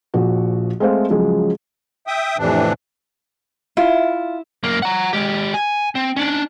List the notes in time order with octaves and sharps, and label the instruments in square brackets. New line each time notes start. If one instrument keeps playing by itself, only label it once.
[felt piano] A#1 F3 F#4
G#3 A3 C4 A4 C5 F5
C#3 F3 F#3 G#3 G#4
[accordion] E5 G5 D#6
F2 A2 C3 E3 D4
[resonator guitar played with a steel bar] E4 [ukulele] F4
[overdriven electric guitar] F#2 A#3
F#5 A#5
G#3 G4
G#5
C4
C#4 D4